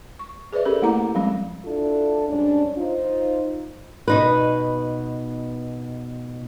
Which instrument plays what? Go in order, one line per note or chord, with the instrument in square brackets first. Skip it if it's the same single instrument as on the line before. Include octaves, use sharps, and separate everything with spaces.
[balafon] C#6
G#4 B4 C5 D5 E5
C#4 G4 A4 A#4
A3 A#3 E4 A#5 D6
F3 G3 G#3 C4 C#4
[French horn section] D4 E4 F4 A4
G#2 G3 C#4 D4
D#4 F4 C5
[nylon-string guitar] B2 D#4 B4